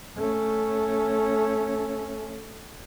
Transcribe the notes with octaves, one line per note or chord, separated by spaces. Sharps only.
A3 C#4